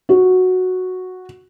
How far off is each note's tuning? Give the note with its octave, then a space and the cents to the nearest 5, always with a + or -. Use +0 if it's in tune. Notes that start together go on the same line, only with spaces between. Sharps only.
F#4 -5